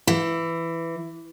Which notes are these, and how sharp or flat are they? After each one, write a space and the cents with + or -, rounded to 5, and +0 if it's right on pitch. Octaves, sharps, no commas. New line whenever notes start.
E3 +10